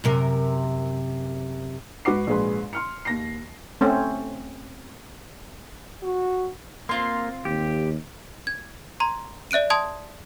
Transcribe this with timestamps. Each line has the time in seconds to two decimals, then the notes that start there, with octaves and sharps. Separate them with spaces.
0.04 F#2 C3 A#4
2.05 G#2 F#4 B4 F#5 D6 C7
2.27 A#1 G#2 G#3 G#4 B4 C6
2.73 C6 F6 C#7
3.05 D#2 A#6 C7
3.81 A3 C4 C#4
6.03 F#4
6.89 A#3 C4 F4 C6
7.45 D#2 G4
8.47 G#6
9.00 A#5 C6 G#6
9.51 D5 E5 F#6 D7 D#7
9.70 A5 C6 D#6 G#6